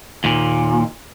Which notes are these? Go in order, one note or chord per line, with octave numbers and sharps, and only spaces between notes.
D#2 A#2